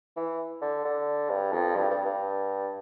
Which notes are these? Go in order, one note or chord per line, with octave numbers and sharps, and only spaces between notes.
E3
D3
D3
G2
F2
G2
G2
G2